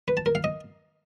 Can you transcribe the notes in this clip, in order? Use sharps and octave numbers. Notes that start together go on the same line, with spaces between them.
B4
A5
A#4
F5
D#5